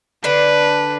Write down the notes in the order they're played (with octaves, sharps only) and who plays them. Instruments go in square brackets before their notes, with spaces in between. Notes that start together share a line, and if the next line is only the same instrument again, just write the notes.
[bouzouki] D3 D4 [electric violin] B4